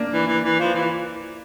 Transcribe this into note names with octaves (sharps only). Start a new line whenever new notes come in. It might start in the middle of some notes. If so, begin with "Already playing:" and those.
Already playing: A#3 D4
E3
E3
E3
F3
E3